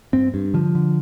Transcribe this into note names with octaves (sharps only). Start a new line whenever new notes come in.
G2 C4
G2
D3 F3
D3